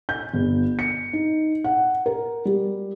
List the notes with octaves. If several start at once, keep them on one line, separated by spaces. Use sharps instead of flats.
G6
G1
C#7
D#4
F#5
A#4
G3